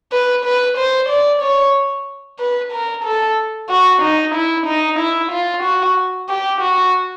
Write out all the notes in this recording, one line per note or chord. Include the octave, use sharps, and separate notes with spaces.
B4
B4
C5
D5
C#5
B4
A#4
A4
F#4
D#4
E4
D#4
E4
F4
F#4
G4
F#4